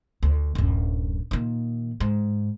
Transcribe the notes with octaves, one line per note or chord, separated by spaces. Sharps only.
D2
D1 F#2
A#2 D#3
G#2